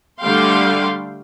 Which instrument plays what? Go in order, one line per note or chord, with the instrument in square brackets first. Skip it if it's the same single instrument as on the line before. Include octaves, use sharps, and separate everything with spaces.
[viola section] D3 G3 A3 F5 G5 C6